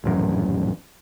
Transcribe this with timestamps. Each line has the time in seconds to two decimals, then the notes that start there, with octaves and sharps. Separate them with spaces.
0.04 D#1 A1 F#2